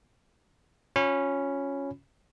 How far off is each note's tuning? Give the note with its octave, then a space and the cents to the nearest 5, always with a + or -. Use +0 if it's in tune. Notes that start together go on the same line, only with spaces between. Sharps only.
C#4 +0 F4 +35 B5 +0